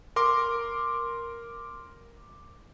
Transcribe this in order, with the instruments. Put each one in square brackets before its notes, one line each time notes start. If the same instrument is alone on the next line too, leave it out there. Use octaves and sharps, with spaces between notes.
[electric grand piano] A#4 C6 D6